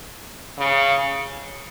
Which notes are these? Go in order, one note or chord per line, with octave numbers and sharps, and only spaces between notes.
C#3